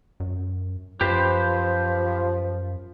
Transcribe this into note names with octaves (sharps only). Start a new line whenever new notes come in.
F#2
F#2 F3 G4 B4 C5